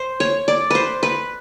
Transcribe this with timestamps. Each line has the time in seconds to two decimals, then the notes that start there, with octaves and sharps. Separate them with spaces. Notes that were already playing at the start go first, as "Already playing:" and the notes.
Already playing: C5
0.20 C#5
0.48 D5
0.70 B4 C5
1.03 B4